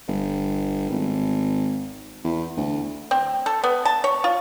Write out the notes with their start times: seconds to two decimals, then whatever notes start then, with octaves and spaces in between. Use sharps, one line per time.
0.08 G1
0.90 G#1
2.24 E2
2.57 D2
3.11 C4
3.46 A4
3.64 B3
3.85 A5
4.04 C#5
4.24 F4